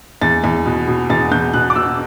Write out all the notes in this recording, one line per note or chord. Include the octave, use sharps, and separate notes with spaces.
E2 A6
E2
B2
B2
E2 A6
E2 G6
B2 F#6
D6
B2 E6